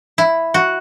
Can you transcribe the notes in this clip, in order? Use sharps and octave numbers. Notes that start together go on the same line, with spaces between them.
E4
F#4